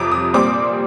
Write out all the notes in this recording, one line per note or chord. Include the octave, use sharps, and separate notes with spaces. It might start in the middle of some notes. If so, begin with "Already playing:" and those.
Already playing: F2 C3 D6 D#6
D#6
A#2 G3 C4 D6